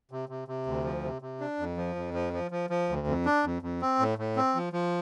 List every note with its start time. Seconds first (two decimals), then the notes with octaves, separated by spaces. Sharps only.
0.11 C3
0.29 C3
0.48 C3
0.66 D2
0.84 F3
1.03 C3
1.22 C3
1.40 D4
1.59 F2
1.77 F3
1.96 F2
2.14 F3
2.33 F3
2.51 F3
2.70 F3
2.89 D2
3.07 F2
3.26 D4
3.44 F2
3.62 F2
3.82 C4
3.99 A2
4.18 A2
4.36 C4
4.55 F3
4.73 F3